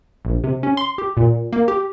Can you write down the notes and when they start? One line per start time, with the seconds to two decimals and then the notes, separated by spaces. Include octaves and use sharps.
0.25 A#1
0.44 C3
0.63 C#4
0.77 C6
0.98 G4
1.17 A#2
1.53 A#3
1.68 G4